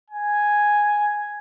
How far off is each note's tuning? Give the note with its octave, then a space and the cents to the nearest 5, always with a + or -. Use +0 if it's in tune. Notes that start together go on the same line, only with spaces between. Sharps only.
G#5 +0